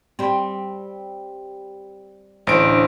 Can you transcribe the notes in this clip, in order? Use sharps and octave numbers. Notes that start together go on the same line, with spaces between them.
G3 C4
A1 D2 A2 C5 D7